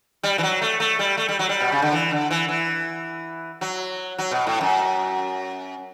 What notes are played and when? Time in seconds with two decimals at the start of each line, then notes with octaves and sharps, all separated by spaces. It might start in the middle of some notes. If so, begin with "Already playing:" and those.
0.23 G3
0.38 E3
0.43 F#3
0.61 A3
0.80 A3
0.99 G3
1.17 A3
1.28 G3
1.39 F#3
1.49 G3
1.60 B2
1.72 C#3
1.82 D3
1.92 E3
2.11 D3
2.30 E3
2.48 E3
3.61 F#3
4.18 F#3
4.31 B2
4.47 A2
4.61 F#2